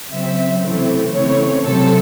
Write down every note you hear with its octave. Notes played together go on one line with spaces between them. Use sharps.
C#3 F#3 C4 E5
C3 E3 A3 C4
C#3 E3 A3 C4 C#5
C3 F#3 C4 A4